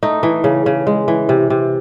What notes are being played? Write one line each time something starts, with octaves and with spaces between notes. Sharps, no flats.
A3 D#4
E3
C#3
C#3
G#3
E3
C3
C3